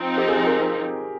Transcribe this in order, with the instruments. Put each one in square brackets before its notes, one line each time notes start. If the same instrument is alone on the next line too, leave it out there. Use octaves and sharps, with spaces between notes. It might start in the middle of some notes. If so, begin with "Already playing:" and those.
Already playing: [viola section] F3 C4 D#4
[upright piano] G4
G#4
A#4